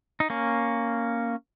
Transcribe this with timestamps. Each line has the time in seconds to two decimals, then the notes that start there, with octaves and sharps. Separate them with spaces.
0.20 D#4
0.30 A#3 C#4